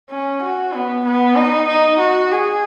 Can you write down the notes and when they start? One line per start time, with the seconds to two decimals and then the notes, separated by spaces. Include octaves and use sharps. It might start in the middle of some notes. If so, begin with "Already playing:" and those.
0.10 C#4
0.41 F#4
0.73 B3
1.04 B3
1.36 D#4
1.68 D#4
1.99 F#4
2.31 G#4